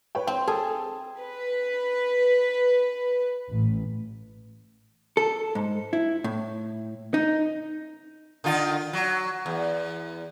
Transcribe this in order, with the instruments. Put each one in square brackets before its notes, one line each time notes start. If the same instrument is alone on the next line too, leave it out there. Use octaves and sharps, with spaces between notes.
[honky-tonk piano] B4 C#5 G5
[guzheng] C4 [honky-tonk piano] G5
[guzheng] G#4 [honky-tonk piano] A4
[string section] B4
A1
[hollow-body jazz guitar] A4
G#2
E4
A2
D#4
[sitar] D3 D#3 F4
F#3
E2